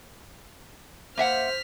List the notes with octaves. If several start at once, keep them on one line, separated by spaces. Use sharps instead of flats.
A#3 C5 E5 F#5 F6 B6